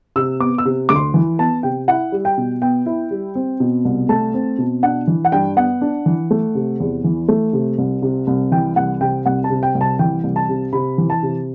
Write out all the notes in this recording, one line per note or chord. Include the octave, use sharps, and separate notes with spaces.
C3 E6
B3 D6
E6
C3
D2 D6
C6
E3
B3 A5
C3 G5
E4 F#5
G3
G5
B2
B3 G5
E4
G3
C4
B2
C2
A3 A5
C4
B2
D4 F#5
E3
F#5
G2 G5
B3 F#5
D4
E3
A3
C3
E2
E3
A3
C3
C2
C3
C2
E3 G5
C2 F#5
C3 G5
C2 F#5
A5
C3
G5
C2
A5
E3 G5
C2
A5
C3
C3 B5
E3
A5
C3